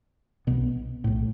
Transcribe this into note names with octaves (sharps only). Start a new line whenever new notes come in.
B1 B2 B3
B1 A2